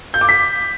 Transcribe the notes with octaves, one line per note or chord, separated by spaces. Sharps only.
G6
D6
B6